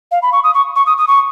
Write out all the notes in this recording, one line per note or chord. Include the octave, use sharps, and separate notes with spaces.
F5
B5
C#6
D#6
C#6
C#6
D#6
D#6
C#6